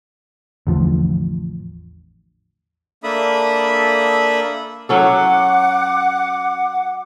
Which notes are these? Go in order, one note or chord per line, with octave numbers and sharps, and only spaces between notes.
A1 E2 D3 F3
A#3 D4 A4 E5 B5 D#6
F#3 C#4 A4 F#5 D6